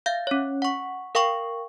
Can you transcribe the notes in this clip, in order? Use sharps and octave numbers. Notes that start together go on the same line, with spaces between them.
E5 F5 G6
C#4 C#5
F#5 C#6
A#4 F5 G5 C#6